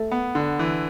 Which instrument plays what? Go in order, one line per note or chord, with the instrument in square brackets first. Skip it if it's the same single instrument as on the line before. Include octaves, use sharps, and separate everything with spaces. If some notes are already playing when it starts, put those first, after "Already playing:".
Already playing: [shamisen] A3
[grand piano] B3
D3
E3